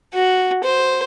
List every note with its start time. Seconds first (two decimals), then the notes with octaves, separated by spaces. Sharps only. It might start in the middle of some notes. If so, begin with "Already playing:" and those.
0.14 F#4
0.63 C5